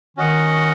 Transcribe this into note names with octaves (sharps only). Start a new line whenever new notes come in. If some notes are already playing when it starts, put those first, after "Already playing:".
D#3 C#4 F#4 D#5 F#5